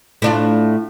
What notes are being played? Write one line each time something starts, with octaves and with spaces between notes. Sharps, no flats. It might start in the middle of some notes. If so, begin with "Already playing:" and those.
A2 D4 F4